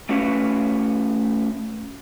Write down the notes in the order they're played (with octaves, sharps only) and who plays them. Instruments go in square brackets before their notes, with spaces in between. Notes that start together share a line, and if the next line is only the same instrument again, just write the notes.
[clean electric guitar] A3 C#4 F#4 B4 C#5 F5